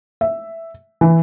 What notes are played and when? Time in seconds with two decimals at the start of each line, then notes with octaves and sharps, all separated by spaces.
0.21 E5
1.01 E3